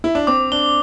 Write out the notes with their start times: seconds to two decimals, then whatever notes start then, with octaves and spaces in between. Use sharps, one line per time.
0.04 E4
0.15 D4
0.27 C4 D6
0.52 D4 G7